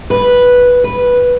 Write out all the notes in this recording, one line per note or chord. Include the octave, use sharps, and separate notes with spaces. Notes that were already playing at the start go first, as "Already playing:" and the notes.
B4
B4